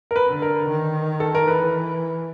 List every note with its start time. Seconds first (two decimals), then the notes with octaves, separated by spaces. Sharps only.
0.11 A#4
0.16 B4
0.28 D3
0.42 A#4
0.69 D#3
1.20 A4
1.35 A#4
1.47 E3 B4